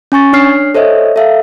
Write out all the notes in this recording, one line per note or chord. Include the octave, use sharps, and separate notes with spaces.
C#4 G#5 C#6 A6
D4 C#5 F6 C7
A4 C5 C#5 D#5 E5
A4 E5 F5